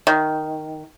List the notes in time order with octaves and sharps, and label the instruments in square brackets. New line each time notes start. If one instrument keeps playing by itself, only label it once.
[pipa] D#3